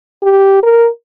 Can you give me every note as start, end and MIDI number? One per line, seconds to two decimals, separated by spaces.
0.23 0.60 67
0.63 0.87 70